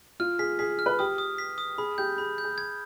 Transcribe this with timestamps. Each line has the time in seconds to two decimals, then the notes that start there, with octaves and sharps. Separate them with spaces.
0.20 F4 F6
0.39 G#4 B6
0.59 G#4 B6
0.79 F6
0.86 B4
0.99 G4 D#6
1.18 D#6
1.38 B6
1.58 D#6
1.78 G#4 B5
1.98 G4 G6
2.18 G#4 B5
2.38 G6
2.44 G#4
2.58 G#6